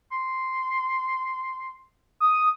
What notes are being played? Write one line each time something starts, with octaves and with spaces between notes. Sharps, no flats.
C6
D#6